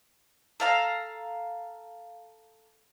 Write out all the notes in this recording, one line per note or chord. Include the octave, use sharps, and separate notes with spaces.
A4 F5 A#5